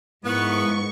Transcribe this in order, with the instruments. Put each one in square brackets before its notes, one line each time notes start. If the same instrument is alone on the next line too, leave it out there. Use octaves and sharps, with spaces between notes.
[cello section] G#2 [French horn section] F3 E4 A#4 [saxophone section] B3 [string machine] C#6